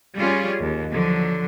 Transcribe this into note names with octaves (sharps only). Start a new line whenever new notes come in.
G3 C#4 F4 G#4
D#2
D3 F3 F#3